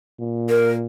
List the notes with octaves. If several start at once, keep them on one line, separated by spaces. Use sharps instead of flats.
A#2
A#4